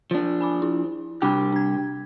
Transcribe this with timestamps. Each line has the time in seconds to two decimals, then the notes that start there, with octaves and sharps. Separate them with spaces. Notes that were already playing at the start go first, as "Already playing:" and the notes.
0.11 F3 D4
0.41 G#5 B5 D6
0.62 E4
1.22 C2 D4 G4 G5 B5
1.52 D4 G#6